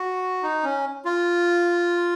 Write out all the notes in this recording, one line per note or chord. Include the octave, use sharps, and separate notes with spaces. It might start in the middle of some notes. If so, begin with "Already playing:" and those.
Already playing: F#4
D#4
C#4
F4